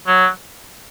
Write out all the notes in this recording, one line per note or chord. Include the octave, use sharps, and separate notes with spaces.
F#3